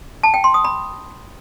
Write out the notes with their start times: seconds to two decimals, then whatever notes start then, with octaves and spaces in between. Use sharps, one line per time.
0.23 A5
0.34 G5
0.44 C6
0.54 D#6
0.65 B5